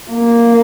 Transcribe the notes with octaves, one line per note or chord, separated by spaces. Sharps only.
A#3